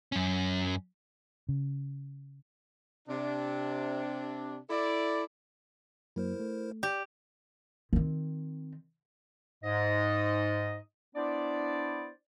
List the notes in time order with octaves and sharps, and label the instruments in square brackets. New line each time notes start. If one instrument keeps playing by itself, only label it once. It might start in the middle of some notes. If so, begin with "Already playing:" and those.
[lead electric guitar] F#2 C#4
[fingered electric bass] C#3
[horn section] C3 D4
E4 A4 D5
[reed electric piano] F#2 F#3 A#3 [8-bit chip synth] E4 A#4 C5
[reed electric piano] A3
[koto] G4 [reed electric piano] D5
[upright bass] D#3 C4
[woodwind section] G#2 D#5
B3 D4 E4 C5 D5